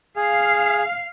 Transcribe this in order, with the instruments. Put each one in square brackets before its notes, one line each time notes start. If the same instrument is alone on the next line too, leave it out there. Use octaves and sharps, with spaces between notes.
[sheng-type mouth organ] G#4 [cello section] F5